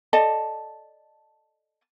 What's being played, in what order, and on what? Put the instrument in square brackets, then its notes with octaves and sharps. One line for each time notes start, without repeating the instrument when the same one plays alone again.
[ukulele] A4 D5 D#5 A5